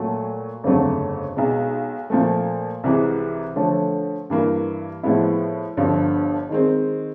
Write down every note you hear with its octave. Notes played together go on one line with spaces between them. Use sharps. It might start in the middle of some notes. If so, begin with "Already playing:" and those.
Already playing: A#2 F#3 A3
G1 F2 C#3 F#3 A3
B1 B2 G#3
A#2 F3 A3
C2 C3 E3 G#3
D3 F3 A3 C#4
G2 E3 G3 A#3
A2 F3 G#3 B3 E4
G1 G2 D3 F3
D#3 G#3 C4